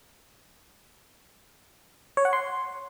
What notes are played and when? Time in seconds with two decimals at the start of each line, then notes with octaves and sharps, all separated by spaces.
2.17 C#5
2.25 F#5
2.33 C6